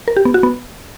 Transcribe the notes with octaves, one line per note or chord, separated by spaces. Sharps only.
A#4
G4
B3
F#4
B3